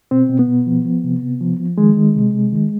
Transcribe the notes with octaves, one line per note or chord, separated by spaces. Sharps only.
B2 C4
B2
B3
B2
F3
F3
C3
C3
F3
F3
D#3 G#3
D#3
C3
C3
D#3